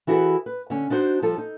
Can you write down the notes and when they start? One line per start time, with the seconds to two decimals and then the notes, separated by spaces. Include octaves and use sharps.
0.07 E3 E4 F#4 G#4 A4 F#5
0.46 B4
0.70 D3 C#4
0.90 D4 D#4 F#4 C5
1.22 F3 G3 F4 A4
1.38 D#4